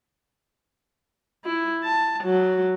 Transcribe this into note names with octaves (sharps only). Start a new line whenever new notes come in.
E4
A5
F#3